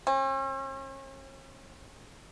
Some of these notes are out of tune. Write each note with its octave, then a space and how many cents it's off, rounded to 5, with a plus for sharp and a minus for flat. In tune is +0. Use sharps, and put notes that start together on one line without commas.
C#4 -45